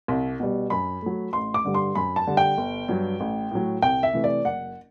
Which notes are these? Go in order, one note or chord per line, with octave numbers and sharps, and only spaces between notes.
C2
B2 G3
F#2 B5
F#3 A3
A1 C6
D6
G2 D3 G3
C6
F#2 B5
A5
D3 G3
G5
G1
G2 F#3
A1
A2 F#3
C2 G5
E5
C3 E3 A3
D5
F#1 F#5